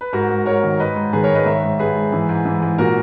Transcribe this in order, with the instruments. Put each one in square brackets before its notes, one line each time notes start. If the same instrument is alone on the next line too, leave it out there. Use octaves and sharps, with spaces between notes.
[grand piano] B4
G#2 F#4 A#4
G#2
G#2 A#4 C#5
D#3
G#2 B4 D#5
G#2
D#3 G#4 B4
A#4 C#5
G#2
B4 D#5
D#3 C#5 E5
G#2
G#2 G#4 B4
G#2
E3
G#2
E3
G#2
A#2 F#4 A#4